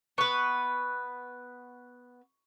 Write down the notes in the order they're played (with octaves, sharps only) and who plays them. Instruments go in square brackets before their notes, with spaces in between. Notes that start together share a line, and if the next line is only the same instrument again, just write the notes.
[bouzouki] B3 B4 [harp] C#6